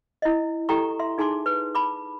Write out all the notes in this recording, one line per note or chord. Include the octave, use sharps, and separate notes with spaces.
E4 D#5
E4 G4 A4 G5 A#5 C#6
E5 C6
D#4 G#4 G#5 A5 C6 D6
B4
A5 B5 D6